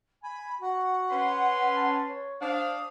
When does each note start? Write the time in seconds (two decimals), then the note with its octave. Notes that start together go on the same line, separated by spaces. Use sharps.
0.23 G#5 B5
0.61 F#4 F#5
1.10 C#4 B4 C6
1.76 A5
2.08 C#5
2.41 D4 C5 F5 D#6